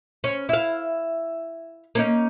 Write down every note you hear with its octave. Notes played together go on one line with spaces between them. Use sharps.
C#4
E4 F5
A#3 C#4 D#4